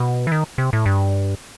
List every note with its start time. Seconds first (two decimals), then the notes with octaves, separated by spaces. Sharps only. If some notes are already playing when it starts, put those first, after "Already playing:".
Already playing: B2
0.27 E3
0.32 D#3
0.58 C3
0.73 A2
0.86 G2